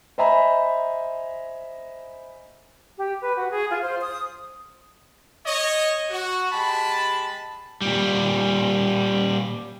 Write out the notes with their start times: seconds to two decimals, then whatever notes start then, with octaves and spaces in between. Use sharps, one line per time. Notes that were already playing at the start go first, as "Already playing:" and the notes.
0.18 C5 D#5 E5 G#5 A#5 B5
2.98 G4
3.22 B4
3.37 F#4
3.51 G#4
3.71 F4
3.82 C5
4.01 D#6
5.46 C#5 D#5
6.10 F#4
6.51 G#3 G4 A5 B5
7.81 A#2 G3